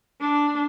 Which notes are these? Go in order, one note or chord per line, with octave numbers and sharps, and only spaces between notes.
D4